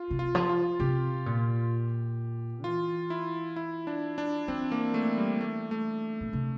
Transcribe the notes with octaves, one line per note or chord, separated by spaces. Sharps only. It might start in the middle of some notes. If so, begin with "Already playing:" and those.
Already playing: F4
C3
F4
F3
F4
C3 G4
A#2
E3 F4
E4
E4
D4
D4
E3 C4
A#3
A3
G3
A3
A3
A#2
C3